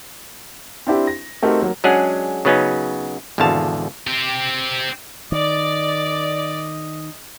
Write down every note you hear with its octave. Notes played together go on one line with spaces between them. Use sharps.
C4 D4 E4 G4
A#6
A3 C4 D#4 F#4 G4 A#4
F#3 A#3
F#3 G#3 C#4 D4 G#4 F#5
C#3 F#3 B3 C#4 D#4
G#1 E2 B2 D3 F5 A5
C4 G4
D#3 D5 D#5